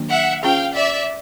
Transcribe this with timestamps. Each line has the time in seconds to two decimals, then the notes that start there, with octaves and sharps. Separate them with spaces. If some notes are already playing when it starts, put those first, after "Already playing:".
Already playing: D#3 F#3 A#3 D4 F#4
0.10 E5 F#5
0.42 C#4 F4 G#4 C5 F5 G5
0.75 D5 E5